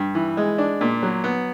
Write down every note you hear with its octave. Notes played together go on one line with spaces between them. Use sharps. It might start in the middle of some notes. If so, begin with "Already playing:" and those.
Already playing: G2
E3
G#3
D4
A#2
F#3
B3